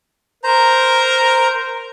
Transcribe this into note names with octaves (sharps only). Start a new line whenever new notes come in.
A#4 C5 A#5